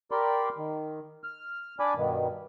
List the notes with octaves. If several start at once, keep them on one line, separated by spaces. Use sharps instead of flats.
G4 A#4 D5 B5 C6
D#3
F6
D4 D5 G#5 B5 D6
G2 B2 D#3